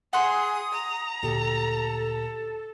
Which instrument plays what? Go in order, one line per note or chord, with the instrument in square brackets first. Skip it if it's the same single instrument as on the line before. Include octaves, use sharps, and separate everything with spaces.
[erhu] G#4 [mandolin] F#5 C6 [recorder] D#6
[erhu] A#5
[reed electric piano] D2 A#2 G4 [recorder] A4